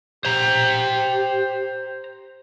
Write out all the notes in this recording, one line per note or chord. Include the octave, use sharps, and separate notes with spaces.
G4 C5 A#5